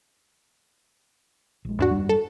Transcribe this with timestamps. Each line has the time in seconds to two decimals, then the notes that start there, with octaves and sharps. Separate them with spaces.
1.65 A#1 G#3
1.79 E2 G#2 D4 F#4
1.91 G#1 F#2 G3
2.09 A4